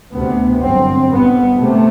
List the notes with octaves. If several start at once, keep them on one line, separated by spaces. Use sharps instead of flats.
D2 C3 B3
G1 F#2 C4
G1 G2 B3
C3 A3